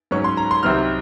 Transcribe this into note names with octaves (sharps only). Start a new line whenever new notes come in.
G#2 F#3 C#4 C#6
C6
A#5
C6
C2 C3 F#3 C4 D#4 F6